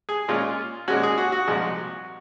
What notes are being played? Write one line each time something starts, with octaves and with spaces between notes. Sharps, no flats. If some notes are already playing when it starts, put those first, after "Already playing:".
G#4
A#2 G#3 C#4 F4
A#2 G#3 C#4 F#4
G#4
F#4
F#4
C2 A#2 F3 G#3